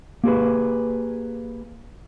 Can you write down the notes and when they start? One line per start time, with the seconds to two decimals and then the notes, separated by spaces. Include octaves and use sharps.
0.24 A#3 G4 G#4 B4